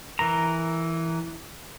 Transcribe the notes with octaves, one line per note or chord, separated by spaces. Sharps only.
E3 A#4 A#5